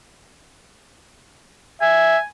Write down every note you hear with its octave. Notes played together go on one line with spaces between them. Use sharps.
E5 G#5